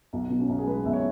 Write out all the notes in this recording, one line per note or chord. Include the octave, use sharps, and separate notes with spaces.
B1
B2
C#4
B1
G#4
G#3 B4
B1 E5
C#5